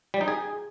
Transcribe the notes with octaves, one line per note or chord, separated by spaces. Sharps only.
G3
D#4
G#4